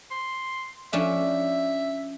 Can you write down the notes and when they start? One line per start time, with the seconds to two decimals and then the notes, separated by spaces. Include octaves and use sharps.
0.11 C6
0.93 F3 C#4 D4 E5